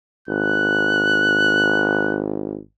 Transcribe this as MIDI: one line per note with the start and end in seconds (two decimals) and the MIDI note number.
0.28 2.58 32
0.28 2.19 90